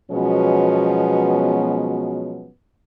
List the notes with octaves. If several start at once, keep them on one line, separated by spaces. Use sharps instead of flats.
B2 F3 F#3 G#3 B3 C#4